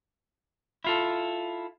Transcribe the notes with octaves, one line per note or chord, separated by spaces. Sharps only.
E4 F4 A4